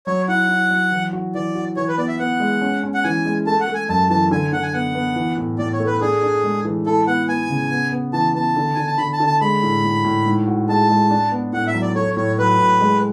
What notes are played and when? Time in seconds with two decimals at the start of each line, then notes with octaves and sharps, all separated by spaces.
0.07 F#3 C#5
0.28 E4 F#5
0.49 E4
0.71 F#3
0.92 E3
1.13 F#4
1.35 E3 D5
1.55 F#4
1.77 E3 C#5
1.88 B4
1.98 B3 D5
2.08 E5
2.19 B3 F#5
2.40 G#3
2.61 C#4
2.83 C#4
2.94 F#5
3.04 E3 G#5
3.25 G#3
3.46 A3 A5
3.60 F#5
3.68 A3
3.74 G#5
3.89 F#2 A5
4.10 E3 A5
4.31 D3 G#5
4.53 D3 F#5
4.63 G#5
4.73 B3 F#5
4.95 B3
5.16 E3
5.37 A2
5.58 A2 D5
5.73 C#5
5.80 A3
5.87 B4
6.01 D4 G#4
6.23 D4
6.44 G#3
6.65 E3
6.86 E4 A4
7.07 B3 F#5
7.29 B3 G#5
7.50 C#3
7.71 B3
7.92 B3
8.13 E3 A5
8.35 B3 A5
8.56 D3
8.75 D3 G#5
8.87 A5
8.98 D3 B5
9.13 A5
9.20 D3
9.27 A5
9.41 G#3 B5
9.63 A2
9.84 A2
10.04 A2
10.26 G#2
10.47 F#4
10.69 G#3 A5
10.89 G#3
11.10 D4
11.32 B3
11.53 A2 F#5
11.67 E5
11.74 F#3
11.82 D5
11.95 A3 C#5
12.17 A2 C#5
12.38 F#3 B4
12.59 A2
12.80 G#3